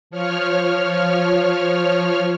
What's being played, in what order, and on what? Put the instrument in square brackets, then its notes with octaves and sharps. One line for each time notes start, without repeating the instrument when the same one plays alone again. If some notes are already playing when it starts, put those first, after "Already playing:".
[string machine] F3 C#5 F6